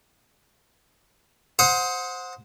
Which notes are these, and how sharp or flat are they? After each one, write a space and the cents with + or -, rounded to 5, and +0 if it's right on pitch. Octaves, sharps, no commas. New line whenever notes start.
C5 +0 F#5 -25 D#6 +25